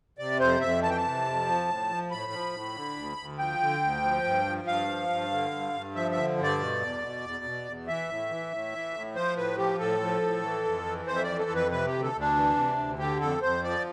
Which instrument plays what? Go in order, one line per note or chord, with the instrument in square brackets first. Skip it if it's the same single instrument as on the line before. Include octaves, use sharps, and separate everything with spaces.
[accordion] C3 D5
F2 C5
F2 E5
E3 A5
G5
A5
C3
F2
F3
A2
F3
A2 B5
F3
A2
D3
D2
D2
F3 G5
D3
D2
F3
G2
F3
G2 F5
F3
G2
D3
G2
G2
F3 E5
E5
D3
G2
D5
B2
E2
B2
E2
B2
E2
E3 E5
A2
E3
A2
E3
A2
F3 C5
A2 B4
F3 G4
A2 A4
F3
A2
E3
F2
E3
F2 C5
E5
D5
E3
A4
F2
B4
C3 B4
G4
D2
A4
D2
D4
E3
C3
D2
D3 G4
F2 A4
F2 C5
F3 D5